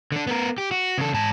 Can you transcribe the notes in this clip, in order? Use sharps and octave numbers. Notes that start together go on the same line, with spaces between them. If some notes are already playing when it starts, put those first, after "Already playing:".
D3 D4
B3 A#4
G4
F#4
C#3 A4
G#2 A5